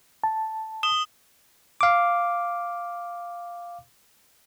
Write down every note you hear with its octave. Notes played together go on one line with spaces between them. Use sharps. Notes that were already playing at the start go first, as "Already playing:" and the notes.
A5
D#6 E7 G7
F5 D6